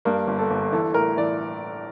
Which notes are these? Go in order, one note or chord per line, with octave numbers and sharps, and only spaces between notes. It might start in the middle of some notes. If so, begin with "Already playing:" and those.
G2 A#3
G1
A4
G1
E3 A4
A2 A#4
E3 D5